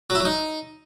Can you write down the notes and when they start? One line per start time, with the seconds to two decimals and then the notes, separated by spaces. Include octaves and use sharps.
0.10 F#3
0.15 E4
0.20 F#3
0.25 D#4